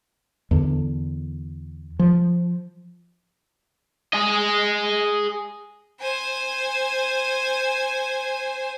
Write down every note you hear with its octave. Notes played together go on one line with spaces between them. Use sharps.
E2 D3
F3
G#4 D#5
C5 G#5